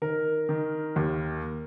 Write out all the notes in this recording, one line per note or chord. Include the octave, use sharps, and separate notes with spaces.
D#3 A#4
D#3
D#2